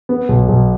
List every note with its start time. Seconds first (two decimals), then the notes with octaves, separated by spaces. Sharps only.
0.09 B3
0.29 B1
0.49 B1